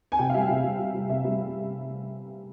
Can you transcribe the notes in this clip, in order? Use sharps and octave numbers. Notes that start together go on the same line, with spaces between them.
G#5
C3 G5
F5
G3 E5
C3
G3
G3
G3
C3 E5
G3